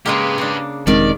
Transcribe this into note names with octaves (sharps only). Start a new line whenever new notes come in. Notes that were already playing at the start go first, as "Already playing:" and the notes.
C#3 G#3 A#3 G4 B4
C#3 D4
E1 D#3 G3 G#3 C4 D5